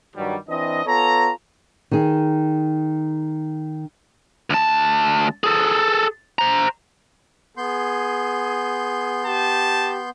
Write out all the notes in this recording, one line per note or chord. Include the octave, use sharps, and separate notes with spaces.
G2 D#3 F#3 G3
E3 C4 D4 D#5
B3 F4 A4 C#5 A#5
D#3 G#4
D2 A5
G#4 A4
C5 A#5
B3 G#4 C6 G6
G4 A5